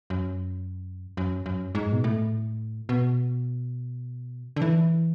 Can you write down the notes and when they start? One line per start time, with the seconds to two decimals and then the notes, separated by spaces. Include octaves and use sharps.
0.10 F#2
1.17 F#2
1.46 F#2
1.75 G#2
1.93 B2
2.04 A2
2.89 B2
4.56 D3
4.62 E3